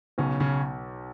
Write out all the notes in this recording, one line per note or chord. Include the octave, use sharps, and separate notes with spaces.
B1 C#3 C#4
C#3 C#4